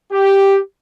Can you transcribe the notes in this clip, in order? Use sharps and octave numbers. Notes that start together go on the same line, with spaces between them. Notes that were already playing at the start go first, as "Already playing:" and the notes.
G4